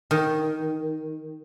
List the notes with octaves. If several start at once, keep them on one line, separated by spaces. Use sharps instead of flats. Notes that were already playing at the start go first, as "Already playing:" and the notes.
D#3